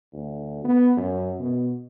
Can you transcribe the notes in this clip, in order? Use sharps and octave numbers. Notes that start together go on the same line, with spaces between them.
D2
B3
F#2
B2